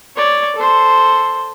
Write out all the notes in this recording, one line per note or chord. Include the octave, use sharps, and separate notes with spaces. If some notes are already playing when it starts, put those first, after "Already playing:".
C#5 D5
A4 C5